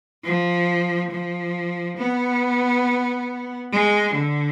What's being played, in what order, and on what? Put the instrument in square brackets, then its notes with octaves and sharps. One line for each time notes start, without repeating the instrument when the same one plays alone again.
[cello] F3
F3
B3
G#3
D3